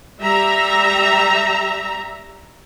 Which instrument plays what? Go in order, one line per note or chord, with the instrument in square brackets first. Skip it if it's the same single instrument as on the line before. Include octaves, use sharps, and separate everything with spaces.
[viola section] G3 E5 A#5